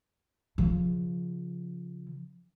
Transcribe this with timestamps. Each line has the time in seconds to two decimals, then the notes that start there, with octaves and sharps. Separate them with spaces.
0.58 C#3 F3